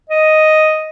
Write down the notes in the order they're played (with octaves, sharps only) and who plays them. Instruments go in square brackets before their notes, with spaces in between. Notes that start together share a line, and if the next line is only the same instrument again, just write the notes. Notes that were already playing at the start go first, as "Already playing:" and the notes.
[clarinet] D#5